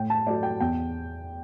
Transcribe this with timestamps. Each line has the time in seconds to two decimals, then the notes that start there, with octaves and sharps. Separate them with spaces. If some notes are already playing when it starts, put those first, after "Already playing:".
Already playing: A2 G5
0.10 A5
0.26 F#3 A3 D5
0.43 G5
0.60 E2 G5